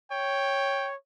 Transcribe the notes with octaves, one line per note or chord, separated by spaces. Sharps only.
C#5 G5